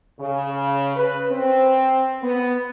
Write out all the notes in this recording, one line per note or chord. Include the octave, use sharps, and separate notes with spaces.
C#3
B4
C4
B3